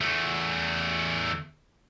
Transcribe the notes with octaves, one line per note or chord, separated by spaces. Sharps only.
E2 A3